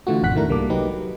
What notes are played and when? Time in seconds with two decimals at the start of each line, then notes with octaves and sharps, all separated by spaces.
0.07 D3 E3 A3 F4 F#4
0.23 G#1 F2 B2 F#5 F#6 B6
0.36 D#3 A3 D4 E4 A#4
0.49 C2 G3 A#3 A4 D6
0.70 F#3 D#4 G4 B4
0.93 F#3